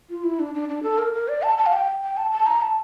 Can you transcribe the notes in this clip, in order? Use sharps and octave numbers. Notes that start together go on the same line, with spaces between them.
F4
E4
D4
D4
D4
A4
A#4
A#4
D5
A5
A5
F5
G5
G5
A5
A5
A#5
A5